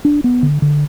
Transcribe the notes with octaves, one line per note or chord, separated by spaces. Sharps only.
D4
B3
D3
D3